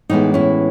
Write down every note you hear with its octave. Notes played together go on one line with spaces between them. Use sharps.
A2 E3 G#3 B3 D#4
C#4 E4